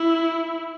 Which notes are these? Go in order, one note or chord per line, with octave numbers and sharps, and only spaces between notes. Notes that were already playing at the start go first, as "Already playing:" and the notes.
Already playing: E4